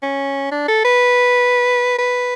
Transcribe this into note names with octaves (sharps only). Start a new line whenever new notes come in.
C#4
D4
A4
B4
B4